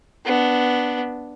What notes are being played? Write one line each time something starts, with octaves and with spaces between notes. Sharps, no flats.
B3 D4